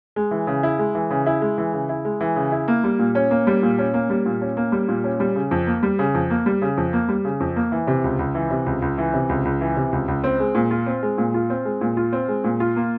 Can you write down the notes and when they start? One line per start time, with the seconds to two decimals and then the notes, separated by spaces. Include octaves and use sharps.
0.16 G#3
0.31 E3
0.47 C#3
0.63 E4
0.79 G#3
0.95 E3
1.10 C#3
1.26 E4
1.42 G#3
1.58 E3
1.73 C#3
1.89 E4
2.05 G#3
2.21 E3
2.36 C#3
2.52 E4
2.68 A#3
2.84 G3
2.99 A#2
3.15 C#4
3.31 A#3
3.47 G3
3.62 A#2
3.78 C#4
3.94 A#3
4.10 G3
4.26 A#2
4.41 C#4
4.57 A#3
4.72 G3
4.88 A#2
5.04 C#4
5.20 G3
5.35 C#3
5.51 F2
5.67 A#3
5.83 G3
5.99 C#3
6.15 F2
6.30 A#3
6.46 G3
6.62 C#3
6.77 F2
6.93 A#3
7.09 G3
7.25 C#3
7.40 F2
7.56 A#3
7.72 E3
7.87 C3
8.04 C#2
8.19 C#2
8.35 E3
8.50 C3
8.66 C#2
8.82 C#2
8.98 E3
9.14 C3
9.29 C#2
9.45 C#2
9.61 E3
9.76 C3
9.92 C#2
10.08 C#2
10.24 C4
10.40 G#3
10.55 A#2
10.71 F4
10.86 C4
11.03 G#3
11.18 A#2
11.34 F4
11.50 C4
11.65 G#3
11.81 A#2
11.97 F4
12.13 C4
12.28 G#3
12.44 A#2
12.60 F4
12.76 A#3